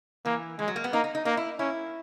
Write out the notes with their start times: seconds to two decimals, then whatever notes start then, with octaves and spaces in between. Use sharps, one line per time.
0.25 E3 A#3
0.59 E3 G#3
0.68 F#3
0.76 A#3
0.84 B3
0.92 A#3 D#4
1.04 D#4
1.15 D#4
1.25 A#3 D#4
1.37 E4
1.59 C#4 E4